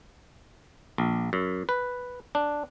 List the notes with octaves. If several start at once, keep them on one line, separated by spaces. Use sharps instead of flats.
A#1
F#2
B4
D4